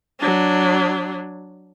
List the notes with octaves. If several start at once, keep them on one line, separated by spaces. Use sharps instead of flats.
F#3 D4